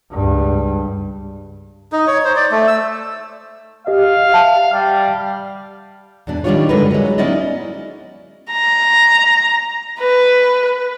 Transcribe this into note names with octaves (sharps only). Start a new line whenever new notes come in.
C#2 G2
D#4
C#5
C5
D5
A3
E6
G4 D#5 F5
E5 F#5 A5
G3
E2 B2 D4
D#3 F#3 G3 D4 F4 C#5
F#2 D3 G#3 A#4 B4
F#3 G#3
B3 C#4 D#4 E4 D5 D#5
A#5
B4